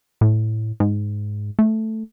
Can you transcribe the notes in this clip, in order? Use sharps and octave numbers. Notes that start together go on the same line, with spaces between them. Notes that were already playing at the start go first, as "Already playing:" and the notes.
A2
G#2
A3